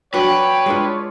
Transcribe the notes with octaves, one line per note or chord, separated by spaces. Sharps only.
F#3 D4 F#4 B4 C#5 G5
G#3 D4 F4